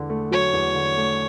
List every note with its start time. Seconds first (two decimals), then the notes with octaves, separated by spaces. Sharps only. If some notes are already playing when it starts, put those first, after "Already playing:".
Already playing: E2 D3
0.10 A3
0.31 F#3 C#5
0.53 E2
0.75 D3
0.97 A3